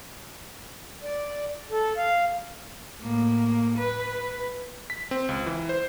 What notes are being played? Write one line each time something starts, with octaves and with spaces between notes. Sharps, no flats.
D5
A4
F5
A2 A#3
B4
B6
C4
C#2
E3
C5